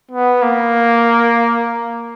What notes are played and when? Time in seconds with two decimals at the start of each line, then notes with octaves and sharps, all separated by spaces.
0.11 B3
0.42 A#3